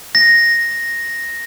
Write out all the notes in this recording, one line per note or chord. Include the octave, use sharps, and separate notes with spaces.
A#6